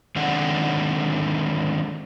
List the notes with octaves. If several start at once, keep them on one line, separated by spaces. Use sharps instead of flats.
D3 D#3 G#3 C4 D4 F#5